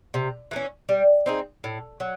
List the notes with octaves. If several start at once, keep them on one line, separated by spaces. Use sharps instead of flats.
C3
E3 A3 C#4
G3
C4 D#4 G#4
A2
F#3